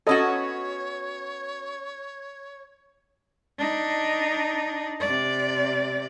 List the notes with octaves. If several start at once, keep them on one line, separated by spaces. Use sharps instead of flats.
B3 C#4 F#4 A4 C#5 D#5
D4 D#4
C3 D5